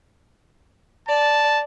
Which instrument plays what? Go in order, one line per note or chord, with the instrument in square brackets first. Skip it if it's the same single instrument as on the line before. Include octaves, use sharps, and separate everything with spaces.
[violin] D5 [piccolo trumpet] A5